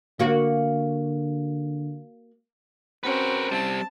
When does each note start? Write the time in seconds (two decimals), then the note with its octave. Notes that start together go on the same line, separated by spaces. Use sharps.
0.20 D3 A#3 F#4
3.04 C4 C#4 F#4 A#4 B4
3.52 G3 C4 A5